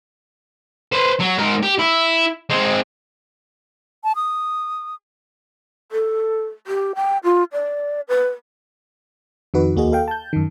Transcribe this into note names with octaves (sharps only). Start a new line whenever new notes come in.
B4 C5
F#3
G#2 A#4
G4
E4
G#3 C4
A5
D#6
A4
G4
G5
F4
D5
B4
F2 D#3 D#4 F#4 B4
D#2 A#3 F#4 G#4 D#5
A4 F5 G5
A5 G6
F#2 D#3